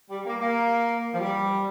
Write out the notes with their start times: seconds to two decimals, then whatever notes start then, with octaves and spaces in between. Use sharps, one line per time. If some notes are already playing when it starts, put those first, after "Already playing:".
0.09 G3
0.24 A#3
0.40 A#3
1.13 F3
1.19 G3